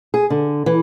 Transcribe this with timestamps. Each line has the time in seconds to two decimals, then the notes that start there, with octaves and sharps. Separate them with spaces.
0.14 G#4
0.30 D3
0.66 E3